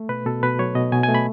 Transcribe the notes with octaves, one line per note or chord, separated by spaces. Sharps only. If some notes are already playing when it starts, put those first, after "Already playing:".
Already playing: A3
B2 B4
B2 A4
B2 B4
F#3 C#5
B2 D#5
B2 G#5
G#5
A3
B5